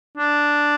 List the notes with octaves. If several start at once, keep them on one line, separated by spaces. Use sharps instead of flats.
D4